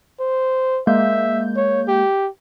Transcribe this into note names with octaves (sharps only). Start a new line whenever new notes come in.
C5
G#3 A#3 E5 G6
C#5
G4